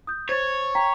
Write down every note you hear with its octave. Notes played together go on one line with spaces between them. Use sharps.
D#6 G6
C5 C#5 G#6 A6
G5 A#5 B6